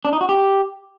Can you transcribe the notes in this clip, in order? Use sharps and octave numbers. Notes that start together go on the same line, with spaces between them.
D4
D#4
F#4
G4